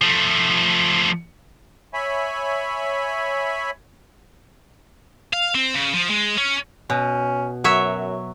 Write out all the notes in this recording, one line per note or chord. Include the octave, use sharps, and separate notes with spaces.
F3 A3
C#5 E5 G#5 B5
F5
C4
C#3
F3
G#3
C#4
B2 C#4
F#2 F#3 C#5 E5